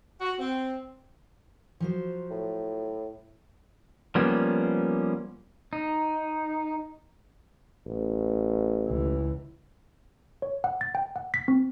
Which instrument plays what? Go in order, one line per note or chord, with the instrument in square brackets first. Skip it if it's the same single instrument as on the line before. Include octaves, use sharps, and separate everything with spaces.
[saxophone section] F#4
C4
[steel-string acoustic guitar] F3 F#3 C5
[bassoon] A2
[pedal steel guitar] F3 G3 A#3 B3 C#4
D#4
[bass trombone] A1
[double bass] C#2 E3
[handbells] C#5
F#5
A6
G5
F#5
B6
C4